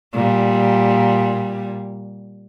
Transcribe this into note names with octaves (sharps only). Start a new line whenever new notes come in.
A#2 G3